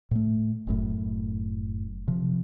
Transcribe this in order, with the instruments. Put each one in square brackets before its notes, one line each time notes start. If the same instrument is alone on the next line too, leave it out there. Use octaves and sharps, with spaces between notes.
[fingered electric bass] A2 A3
F#1 F#2 A2
C3 F3